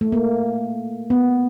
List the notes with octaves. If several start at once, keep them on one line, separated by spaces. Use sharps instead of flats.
A3
A#3
B3